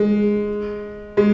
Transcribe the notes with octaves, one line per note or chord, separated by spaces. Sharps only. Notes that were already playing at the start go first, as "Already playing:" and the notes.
Already playing: G#3
G#3